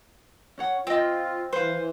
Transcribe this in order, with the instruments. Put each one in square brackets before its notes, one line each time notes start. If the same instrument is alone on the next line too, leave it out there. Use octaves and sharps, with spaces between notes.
[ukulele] C#4 C#5 F#5
[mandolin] C4 [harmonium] F4 [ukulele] D#5 G5
[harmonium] E3 [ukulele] B4 F5 [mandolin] C5
[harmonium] E3